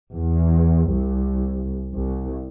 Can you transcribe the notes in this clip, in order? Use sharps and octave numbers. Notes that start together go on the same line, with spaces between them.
E2
C2
C2